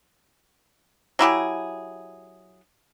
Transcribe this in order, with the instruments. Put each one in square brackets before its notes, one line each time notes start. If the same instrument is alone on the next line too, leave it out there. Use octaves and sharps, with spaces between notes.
[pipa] F#3 E4 G4 G#4